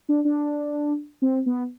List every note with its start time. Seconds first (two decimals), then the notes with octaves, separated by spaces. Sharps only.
0.09 D4
0.25 D4
1.22 C4
1.46 B3